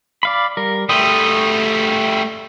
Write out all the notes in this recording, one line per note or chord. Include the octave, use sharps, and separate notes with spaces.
D5 F5 B5
G3 A#4
G3 A3 G5 C6 D#6